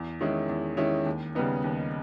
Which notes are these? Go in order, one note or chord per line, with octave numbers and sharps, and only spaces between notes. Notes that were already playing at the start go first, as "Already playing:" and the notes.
Already playing: E2
D#3 G#3 C#4 E4
E2
D#3 G#3 C#4 E4
D#2
C#3 G3 B3 D#4
D#2